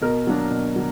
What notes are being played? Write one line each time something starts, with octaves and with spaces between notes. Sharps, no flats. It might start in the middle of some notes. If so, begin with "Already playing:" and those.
B2 A#4
F#3 A#3 D4
B2
F#3